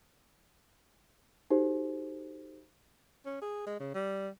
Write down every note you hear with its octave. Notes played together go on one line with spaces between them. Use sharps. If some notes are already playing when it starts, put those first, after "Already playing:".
D#4 F#4 G4 A4 C5
C#4
G#4
G#3
C#3
G3